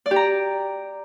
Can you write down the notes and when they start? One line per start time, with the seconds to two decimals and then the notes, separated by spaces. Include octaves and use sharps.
0.06 D5
0.11 G4
0.16 A#5